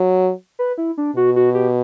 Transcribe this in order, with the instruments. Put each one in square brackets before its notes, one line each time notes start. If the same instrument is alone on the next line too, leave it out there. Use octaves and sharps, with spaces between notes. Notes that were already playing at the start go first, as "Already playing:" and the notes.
Already playing: [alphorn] F#3
[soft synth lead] B4
E4
D4
[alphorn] B2 [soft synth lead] F#4
[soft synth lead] F#4
G4